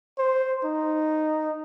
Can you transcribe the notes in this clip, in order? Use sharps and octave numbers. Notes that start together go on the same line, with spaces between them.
C5
D#4